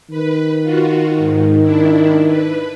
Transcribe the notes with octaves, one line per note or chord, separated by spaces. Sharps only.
D#3 B4
F4 F#4
G#2
D4 E4
B4